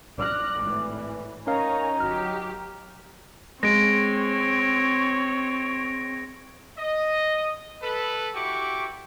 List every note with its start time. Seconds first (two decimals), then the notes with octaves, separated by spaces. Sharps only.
0.19 D5 F6 F#6 A#6
0.62 G#1 A2 E3
1.47 C#4 D#4 A#4 C#5 F5 G#5 A#5
2.00 G1 F#3 G4 F6
3.63 G#3 C4 C#5 A#6 D7
6.78 D#5
7.83 A4 B4
8.34 E4 F#4 G4 C#6 D6